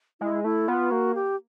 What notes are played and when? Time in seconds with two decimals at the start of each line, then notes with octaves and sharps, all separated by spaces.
0.21 G#3 E4
0.44 A3 E4
0.68 B3 F4
0.91 A#3 F#4
1.15 G4